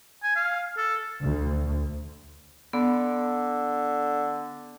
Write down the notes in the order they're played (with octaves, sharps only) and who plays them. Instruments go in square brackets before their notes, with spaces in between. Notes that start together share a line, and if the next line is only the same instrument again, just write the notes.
[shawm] G#5
F5
A4
[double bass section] D2
[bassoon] D3 [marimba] B3